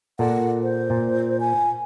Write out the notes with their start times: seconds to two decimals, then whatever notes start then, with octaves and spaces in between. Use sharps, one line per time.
0.19 A#2 A4 D5 F#5
0.63 C5
0.90 A#2
1.40 G#5